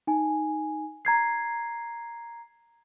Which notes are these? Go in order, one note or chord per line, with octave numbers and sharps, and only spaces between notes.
D#4 G#5
A#5 G#6 C7